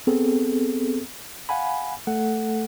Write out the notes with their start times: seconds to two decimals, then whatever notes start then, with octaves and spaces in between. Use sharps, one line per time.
0.07 B3 C4 G#4 A4
1.49 F5 F#5 G#5 B5
2.07 A3 A4 F#5